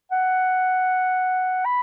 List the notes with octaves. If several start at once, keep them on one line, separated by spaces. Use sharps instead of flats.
F#5
B5